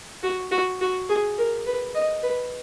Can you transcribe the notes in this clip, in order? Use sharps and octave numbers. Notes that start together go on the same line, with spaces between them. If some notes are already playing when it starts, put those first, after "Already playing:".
F#4
F#4
F#4
G#4
A#4
B4
D#5
B4